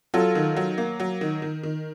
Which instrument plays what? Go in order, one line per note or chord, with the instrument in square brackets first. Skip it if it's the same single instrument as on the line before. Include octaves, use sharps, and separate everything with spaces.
[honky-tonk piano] F#3 [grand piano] F4 A4
[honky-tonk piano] D#3
F#3
A#3
F#3
D#3
D#3
D#3